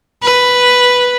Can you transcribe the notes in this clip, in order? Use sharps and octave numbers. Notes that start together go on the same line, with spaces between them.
B4